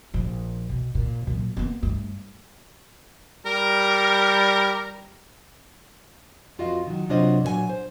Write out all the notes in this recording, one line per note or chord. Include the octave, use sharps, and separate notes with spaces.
A#1 F3
B2
A#2
A#2 F#3
A#3 B3
G2 A3
G3 A#4
F2 F4 F#4 D#5 F5
D#3 F#3
C3 F#3 D4 F4 C5 D#5
A#2 F#3 B4 G#5
C5